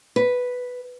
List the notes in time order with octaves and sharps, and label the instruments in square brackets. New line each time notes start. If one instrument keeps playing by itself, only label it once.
[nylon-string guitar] B4